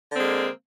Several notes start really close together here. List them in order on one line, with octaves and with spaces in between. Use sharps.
D3 C4 G#3 A#3